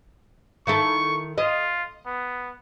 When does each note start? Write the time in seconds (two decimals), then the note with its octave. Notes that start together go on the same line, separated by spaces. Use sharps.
0.67 D#3 E4 A4 C#6
1.38 F4 D#5
2.06 B3